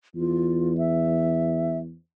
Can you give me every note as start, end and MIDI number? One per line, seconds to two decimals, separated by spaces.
0.15 1.95 40
0.15 0.76 65
0.78 1.78 76